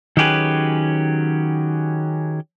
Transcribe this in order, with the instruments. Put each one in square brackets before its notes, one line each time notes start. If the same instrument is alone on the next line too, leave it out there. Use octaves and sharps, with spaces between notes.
[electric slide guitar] D#3 F#3 C#4 G4 G#4 B4